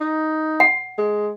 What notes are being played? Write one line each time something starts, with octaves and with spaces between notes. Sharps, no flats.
D#4
F#5
G#3